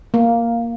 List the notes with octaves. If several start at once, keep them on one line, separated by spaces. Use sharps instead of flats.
A#3